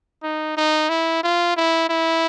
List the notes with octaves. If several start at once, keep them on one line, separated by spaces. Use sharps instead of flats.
D#4
D#4
E4
F4
E4
E4